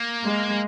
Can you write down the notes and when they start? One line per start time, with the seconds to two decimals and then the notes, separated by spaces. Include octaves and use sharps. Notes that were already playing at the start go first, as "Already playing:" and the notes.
Already playing: A#3
0.22 G#3